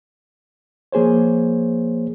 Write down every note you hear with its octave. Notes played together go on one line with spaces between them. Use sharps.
F3 A#3 G#4 C5 C#5